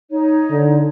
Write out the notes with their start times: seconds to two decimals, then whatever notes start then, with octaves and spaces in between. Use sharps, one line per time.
0.11 D#4 C#5
0.51 D3